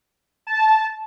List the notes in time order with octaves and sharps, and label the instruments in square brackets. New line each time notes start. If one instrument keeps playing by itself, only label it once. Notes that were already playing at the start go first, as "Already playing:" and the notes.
[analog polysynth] A5